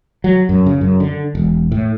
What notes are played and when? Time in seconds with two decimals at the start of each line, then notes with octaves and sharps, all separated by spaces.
0.24 F#3
0.49 F#2
0.66 C#3
0.81 F#2
1.00 D3
1.35 E1
1.72 A2